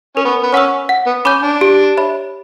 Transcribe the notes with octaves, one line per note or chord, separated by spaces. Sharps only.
C#4 A#4
B3
B3
C#4 C#5 F#5 C#6 E6
F#5
B3
C#4 B5 D6 G6
D4
G4
C#5 E5 B5